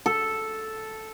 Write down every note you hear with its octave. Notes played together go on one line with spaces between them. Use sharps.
A4